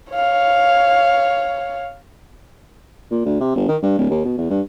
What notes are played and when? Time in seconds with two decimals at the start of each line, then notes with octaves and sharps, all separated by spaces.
0.13 C#5 F5
3.11 A#2
3.25 D2
3.41 C3
3.55 G1
3.68 D#3
3.82 G2
3.98 D1
4.10 D#2
4.25 B2
4.37 E2
4.50 G2